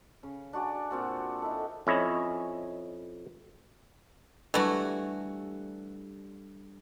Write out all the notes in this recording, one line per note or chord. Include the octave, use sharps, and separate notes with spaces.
C#3
D4 F#4 D5 G#5
A#2 C4 F#4
D#4 E4 A4
F2 C#4 E4 C#5 D#5
E3 G3 A3 D4 F#4 A4